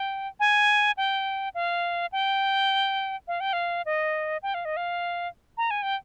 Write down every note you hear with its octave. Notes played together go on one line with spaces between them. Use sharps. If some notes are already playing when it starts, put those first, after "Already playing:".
Already playing: G5
G#5
G5
F5
G5
F5
G5
F5
D#5
G5
F5
D#5
F5
A#5
G#5
G5